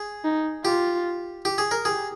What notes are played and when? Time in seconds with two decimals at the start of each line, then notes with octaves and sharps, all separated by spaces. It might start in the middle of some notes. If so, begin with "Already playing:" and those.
Already playing: G#4
0.25 D#4
0.64 F4 G4
1.45 G4
1.58 G#4
1.71 A#4
1.85 G4 G#4